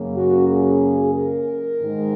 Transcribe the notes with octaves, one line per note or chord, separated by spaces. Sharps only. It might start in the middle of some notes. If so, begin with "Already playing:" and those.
Already playing: F#2 C#3 F#3 A#3
F#4
G#4
A#4
G#2 D#3 G#3